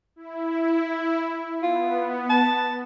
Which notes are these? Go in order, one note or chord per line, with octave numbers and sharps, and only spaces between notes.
E4
B3 F4
A5